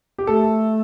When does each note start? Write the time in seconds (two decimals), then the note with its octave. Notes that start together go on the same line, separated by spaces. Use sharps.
0.18 G4
0.27 A3 A4